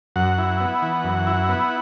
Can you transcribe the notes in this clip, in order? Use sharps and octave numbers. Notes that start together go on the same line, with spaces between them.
F#2 F#5
E4
B3
E3
F#2
E4
B3